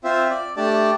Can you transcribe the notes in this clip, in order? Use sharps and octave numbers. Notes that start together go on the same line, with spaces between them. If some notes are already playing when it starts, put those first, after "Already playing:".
C4 F4 C5 E5
D5
A3 D4 G4 D5 A5